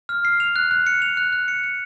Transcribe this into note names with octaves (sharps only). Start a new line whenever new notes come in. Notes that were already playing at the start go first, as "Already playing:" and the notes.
F6
C7
F7
F#6
F#6
C#7
F7
F#6
F#6
C#7
C#7